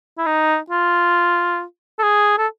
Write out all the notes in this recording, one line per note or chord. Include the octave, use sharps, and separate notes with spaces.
E4
D#4
F4
A4
G#4
A4